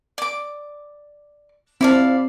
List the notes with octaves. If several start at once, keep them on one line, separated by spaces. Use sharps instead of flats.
D5 D6
C4 E4 D5 F5 A5